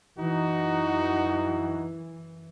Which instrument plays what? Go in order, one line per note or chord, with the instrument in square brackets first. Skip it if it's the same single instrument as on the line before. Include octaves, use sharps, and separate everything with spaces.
[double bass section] F#2 E3 [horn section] D#4 F#4